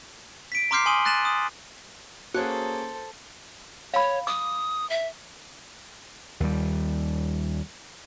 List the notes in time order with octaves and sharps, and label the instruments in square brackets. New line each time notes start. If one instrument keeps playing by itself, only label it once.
[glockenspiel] B6 D7
A#5 C6 D6 F6 G6 C7
G#5 C6 D#6 D#7 F#7 G7
F#6 A6 A#6 D#7 E7 F#7
D#6
[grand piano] A#3 C#4 G#4 [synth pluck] F#4 [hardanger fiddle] A4 C5
[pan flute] C#5 [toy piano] F5 B5
[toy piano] D6 [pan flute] D#6
[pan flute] E5
[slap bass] D#2 G3